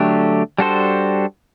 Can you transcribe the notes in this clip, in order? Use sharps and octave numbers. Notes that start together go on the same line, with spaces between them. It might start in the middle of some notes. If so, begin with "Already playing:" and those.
Already playing: D3 F#3 A3 D4 G4
G3 D4 F#4 A4 C5